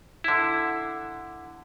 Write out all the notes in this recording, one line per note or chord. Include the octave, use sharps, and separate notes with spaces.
D3 E4